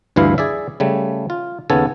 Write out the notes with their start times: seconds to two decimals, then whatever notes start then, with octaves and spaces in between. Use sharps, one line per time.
0.16 D2 G2 E3 E4 F5
0.38 G#4 D5 E5
0.80 C#3 G3 A3
1.30 F4
1.70 D#2 C#3 B3 C#4 A4 G#5